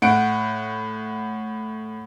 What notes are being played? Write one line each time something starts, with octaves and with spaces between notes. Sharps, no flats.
A2 F#5 D7